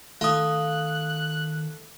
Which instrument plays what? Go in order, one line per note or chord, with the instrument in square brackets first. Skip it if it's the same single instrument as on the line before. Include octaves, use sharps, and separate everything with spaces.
[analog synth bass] D#3 [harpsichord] A3 F4 F#5 [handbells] F5 D#6 [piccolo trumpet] F#6